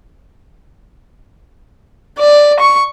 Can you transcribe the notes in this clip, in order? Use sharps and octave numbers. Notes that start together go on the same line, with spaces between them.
D5
C#6